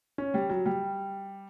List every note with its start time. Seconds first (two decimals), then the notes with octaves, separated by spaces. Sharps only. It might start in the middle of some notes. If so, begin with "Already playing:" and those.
0.18 C#4
0.34 G3
0.50 F#3
0.66 G3